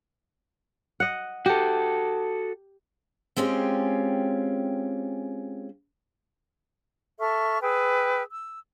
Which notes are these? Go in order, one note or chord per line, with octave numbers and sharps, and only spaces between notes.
D#5 F#5
F#4 G4 A4
G#3 C4 C#4 F4 G4
A4 E5 C#6 F6
G#4 B4 G5 E6
E6